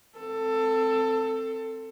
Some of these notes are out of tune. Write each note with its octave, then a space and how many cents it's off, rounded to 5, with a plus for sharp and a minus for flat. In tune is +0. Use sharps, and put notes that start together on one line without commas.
C4 +0 A4 +20